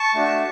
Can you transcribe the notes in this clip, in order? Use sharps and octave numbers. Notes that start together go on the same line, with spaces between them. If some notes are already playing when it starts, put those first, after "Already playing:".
Already playing: A5 C#6
A3 D4 F#4